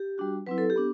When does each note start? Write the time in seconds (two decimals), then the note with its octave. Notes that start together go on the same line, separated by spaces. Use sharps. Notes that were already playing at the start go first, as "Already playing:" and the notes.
Already playing: G4
0.18 G3 D4 F#4
0.46 F#3 C4 E4 B4
0.58 A4
0.70 G4
0.76 B3 D4